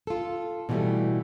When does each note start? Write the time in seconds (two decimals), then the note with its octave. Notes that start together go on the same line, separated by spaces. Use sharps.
0.07 F4 A4
0.69 B2 E3 F3 G3 A3 B3